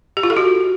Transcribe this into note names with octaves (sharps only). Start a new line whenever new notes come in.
G4
F4
A4
F#4